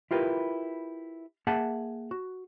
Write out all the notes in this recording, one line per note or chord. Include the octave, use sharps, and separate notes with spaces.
E4 F4 G4 A#4 B4
A#3 G#4 E5 F#5 G#5 A5
F#4